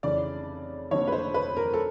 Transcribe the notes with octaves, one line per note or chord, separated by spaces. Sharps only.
F1 F2 C#3 E3 D5
F1 F2 D3 F3 A#3 C#5
B4
C5
B4
A#4
A4